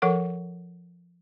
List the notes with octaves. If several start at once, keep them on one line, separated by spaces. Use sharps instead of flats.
F3 A4 A#4 F#5 C#6